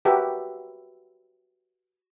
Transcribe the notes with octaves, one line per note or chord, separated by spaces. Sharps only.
F#4 G4 A#4 B4 E5